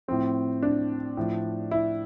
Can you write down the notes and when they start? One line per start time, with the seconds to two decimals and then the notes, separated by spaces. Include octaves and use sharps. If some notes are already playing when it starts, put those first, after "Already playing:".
0.08 A2 F3 C4
0.62 D4
1.17 A2 F3
1.71 E4